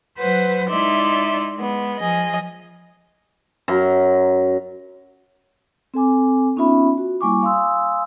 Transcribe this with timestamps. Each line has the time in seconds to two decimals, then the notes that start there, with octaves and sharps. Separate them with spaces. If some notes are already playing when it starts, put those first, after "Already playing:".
0.18 F#3 B4 C5 F#5
0.69 G#3 D#4 E4 D5 E5 C6
1.57 G#3 B3
2.00 F3 G#4 D#5
3.68 F#2 A#5
5.94 C4 A4 G#5 D6
6.56 B3 C#4 D#4 F4 E5 B5
6.98 F#4
7.21 G3 A#3 E4 G#5 C#6 D6
7.43 F5 G#5 C6 D#6 E6